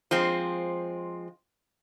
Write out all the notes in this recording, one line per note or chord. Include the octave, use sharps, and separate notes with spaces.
F3 G#3 C4